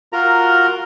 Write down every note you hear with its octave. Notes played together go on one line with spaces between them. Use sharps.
F4 F#4 A#4 A#5